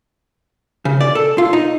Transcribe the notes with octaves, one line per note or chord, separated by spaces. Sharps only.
C#3
D5
A4
F4
D#4